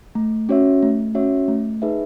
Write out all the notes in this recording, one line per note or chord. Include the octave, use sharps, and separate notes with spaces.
A3
C#4 F#4 C#5 E5
A3
C#4 F#4 C#5 E5
A3
D#4 G#4 B4 E5